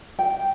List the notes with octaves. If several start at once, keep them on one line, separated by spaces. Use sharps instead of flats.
G5